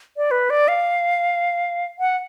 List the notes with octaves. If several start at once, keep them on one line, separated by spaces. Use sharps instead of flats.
D5
B4
D5
F5
F#5